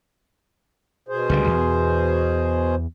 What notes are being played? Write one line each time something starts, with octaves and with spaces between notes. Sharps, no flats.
B2 G#4 C5
C#2 D3 G3
E2